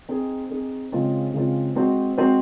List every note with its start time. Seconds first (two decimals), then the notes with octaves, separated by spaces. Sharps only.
0.09 C4 D#4 G#4
0.50 C4 D#4 G#4
0.92 C#3 G#3 C4 F4
1.34 C#3 G#3 C4 F4
1.75 G#3 C4 F#4 C5
2.17 G#3 C4 F#4 C5